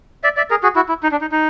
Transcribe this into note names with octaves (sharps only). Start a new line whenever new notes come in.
D5 E5
D5 E5
G#4 A#4
F#4 G#4
E4 F#4
E4
D#4
D4
D#4
D#4